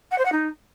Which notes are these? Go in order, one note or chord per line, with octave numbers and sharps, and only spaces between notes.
F#5
C5
F#5
D#4